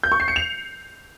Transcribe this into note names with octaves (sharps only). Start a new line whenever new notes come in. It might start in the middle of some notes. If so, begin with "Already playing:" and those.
G6
C#6
C7
C#7
F7